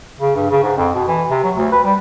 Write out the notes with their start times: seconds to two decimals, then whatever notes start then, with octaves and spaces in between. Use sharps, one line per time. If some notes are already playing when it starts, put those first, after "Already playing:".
0.20 C#3
0.36 G2
0.51 C#3
0.63 G#2
0.77 F2
0.95 B2
1.08 E3
1.31 C3
1.44 F#3
1.57 D2
1.72 B4
1.84 G3